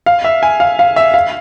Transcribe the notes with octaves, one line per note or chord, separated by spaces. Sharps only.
F5
E5
G#5
F5
F5
E5
F5